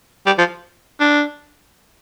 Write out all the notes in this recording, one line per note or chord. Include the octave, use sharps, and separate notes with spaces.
G3
F3
D4